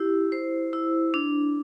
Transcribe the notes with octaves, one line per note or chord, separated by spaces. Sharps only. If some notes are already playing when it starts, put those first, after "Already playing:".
Already playing: E4 G4
C5
E4
D4